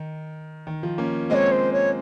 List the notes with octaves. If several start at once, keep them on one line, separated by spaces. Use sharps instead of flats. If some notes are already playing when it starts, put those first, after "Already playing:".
Already playing: D#3
D#3
F3
A#3 C#4
G#3 C4 C#5 D#5
C5
C#5